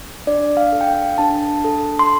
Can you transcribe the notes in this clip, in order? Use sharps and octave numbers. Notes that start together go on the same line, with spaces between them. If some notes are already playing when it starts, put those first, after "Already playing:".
D4 D5
F5
A4
G5
F5
D4 A5
A4
C6